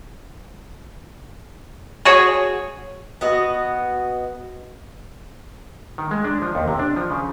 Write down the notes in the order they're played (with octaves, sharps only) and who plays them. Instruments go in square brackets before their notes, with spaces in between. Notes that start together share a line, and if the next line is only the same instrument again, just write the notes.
[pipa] F#4 G#4 C#5
[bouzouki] B3 F#4 D#5
[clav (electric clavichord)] D#3
G#3
D4
F3
D#2
C3
D4
F3
C#3